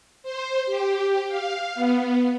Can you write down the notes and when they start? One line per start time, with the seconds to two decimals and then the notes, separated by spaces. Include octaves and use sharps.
0.23 C5
0.66 G4
1.28 F5
1.75 B3